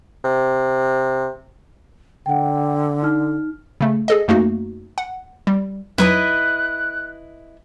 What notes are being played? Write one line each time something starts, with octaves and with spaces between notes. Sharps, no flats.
C3
D3 F#5 G5
D#4 F6
C#3 A3
G#4 A4 D#5
F#2 A3 A#3 D#4 F#4
F#5
G3
F2 F#3 D#4 E4 B4 D#5 F#6